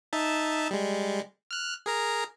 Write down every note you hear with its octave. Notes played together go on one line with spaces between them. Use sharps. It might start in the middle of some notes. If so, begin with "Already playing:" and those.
D#4 E5 A5
G3 G#3
F6 F#6
G#4 A#4 A#5